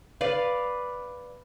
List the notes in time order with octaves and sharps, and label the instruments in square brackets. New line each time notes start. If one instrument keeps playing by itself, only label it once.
[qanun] B4 D5 F5